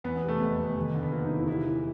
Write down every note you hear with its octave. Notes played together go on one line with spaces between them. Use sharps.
E2 B3
B3
C3
A3
F1 B3
F1
D#2
D3
B3
F3 A#3
D#4
E1
E4
C3 E4
E3